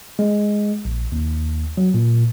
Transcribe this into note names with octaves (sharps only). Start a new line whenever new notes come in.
G#3
A#1
D#2
F#3
A#2